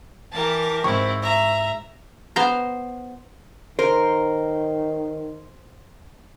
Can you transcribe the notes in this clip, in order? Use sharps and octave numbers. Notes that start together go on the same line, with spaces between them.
E3 G4 A#4 A5
D#2 G#2 C4 E4 C#6
E5 A#5
B3 C5 A#5
D#3 A#4 C5